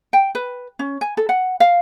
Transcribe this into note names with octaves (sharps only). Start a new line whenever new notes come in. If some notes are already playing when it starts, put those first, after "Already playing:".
G5
B4
C#4
G#5
A4
F#5
F5